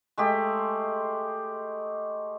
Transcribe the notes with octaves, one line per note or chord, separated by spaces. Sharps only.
G#3 A3 G4